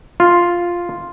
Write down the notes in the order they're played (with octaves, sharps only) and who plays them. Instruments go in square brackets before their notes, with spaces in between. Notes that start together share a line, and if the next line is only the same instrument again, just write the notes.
[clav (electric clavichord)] F4